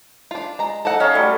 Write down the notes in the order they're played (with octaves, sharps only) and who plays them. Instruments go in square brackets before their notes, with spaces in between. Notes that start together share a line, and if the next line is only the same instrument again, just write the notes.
[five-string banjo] D4 F4
G#3 A#5
A4 D#5 F#5
[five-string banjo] C#4 D#4 [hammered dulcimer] C#5 D#5 F5
[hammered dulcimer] F#3 G3 A3